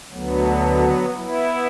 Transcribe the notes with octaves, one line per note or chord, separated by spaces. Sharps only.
D2 D3 F#3 B3
B3 E4